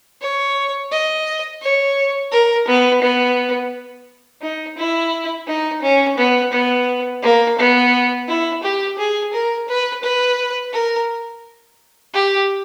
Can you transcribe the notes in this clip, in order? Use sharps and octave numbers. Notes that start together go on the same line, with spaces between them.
C#5
D#5
C#5
A#4
B3
B3
D#4
E4
D#4
C#4
B3
B3
A#3
B3
E4
G4
G#4
A#4
B4
B4
A#4
G4